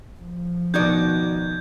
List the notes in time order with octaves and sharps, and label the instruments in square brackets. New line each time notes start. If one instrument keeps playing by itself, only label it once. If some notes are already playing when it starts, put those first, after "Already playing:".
[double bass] F3
[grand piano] B2 D#3 [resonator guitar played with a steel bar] D#4 F#4 D5 [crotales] G6 G#6